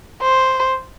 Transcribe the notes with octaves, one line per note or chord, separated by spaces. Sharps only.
C5